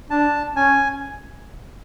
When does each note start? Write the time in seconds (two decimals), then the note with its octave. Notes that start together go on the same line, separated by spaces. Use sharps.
0.11 D4 A5
0.56 C#4 G#5